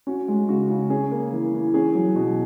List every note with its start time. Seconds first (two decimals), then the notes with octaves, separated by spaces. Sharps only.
0.07 C#4 F#4
0.28 G#3
0.49 C#3 F#4
0.70 C#3
0.90 C#4 G#4
1.11 A#3
1.32 E3
1.54 E3
1.74 C#4 G#4
1.95 F#3
2.15 B2 F#4